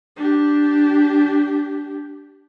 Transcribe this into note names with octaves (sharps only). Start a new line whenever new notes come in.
D4 G4